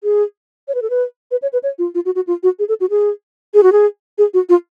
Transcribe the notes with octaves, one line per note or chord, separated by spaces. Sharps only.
G#4
C#5
B4
A4
B4
B4
C#5
B4
C#5
F4
F4
F#4
F#4
F4
F#4
G#4
A4
F#4
G#4
G#4
F#4
G#4
G#4
F#4
F4